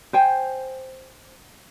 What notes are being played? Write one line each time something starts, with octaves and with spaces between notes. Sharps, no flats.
C5 G5 G#5